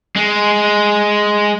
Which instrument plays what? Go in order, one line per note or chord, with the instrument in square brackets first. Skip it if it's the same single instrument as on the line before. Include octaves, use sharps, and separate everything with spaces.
[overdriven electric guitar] G#3